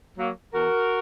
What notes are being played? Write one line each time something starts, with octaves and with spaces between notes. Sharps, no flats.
F#3 A#3
E2 F#4 A#4